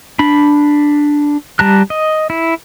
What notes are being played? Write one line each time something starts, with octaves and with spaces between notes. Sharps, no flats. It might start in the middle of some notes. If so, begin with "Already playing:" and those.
D4 B5
G3 A5 A#5 F#6
D#5
E4